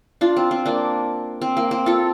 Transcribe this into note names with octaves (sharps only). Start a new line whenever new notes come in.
D4 F4
C4
C4
A#3 D4
C4
A#3
C4
F4 A4